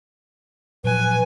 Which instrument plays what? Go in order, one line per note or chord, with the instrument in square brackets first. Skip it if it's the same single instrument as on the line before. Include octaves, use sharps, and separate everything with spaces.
[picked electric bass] A#2 F3 F#3 [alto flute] B4 [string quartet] G#5